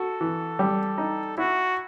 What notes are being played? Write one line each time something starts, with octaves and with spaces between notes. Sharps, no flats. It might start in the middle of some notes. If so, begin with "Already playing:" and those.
Already playing: F#4 A4
E3
G3
D#4
E4 F#4